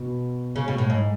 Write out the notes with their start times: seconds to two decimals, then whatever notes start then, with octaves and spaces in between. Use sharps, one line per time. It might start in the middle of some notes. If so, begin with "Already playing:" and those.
Already playing: B2
0.56 C#3
0.68 B2
0.78 A2
0.90 G#2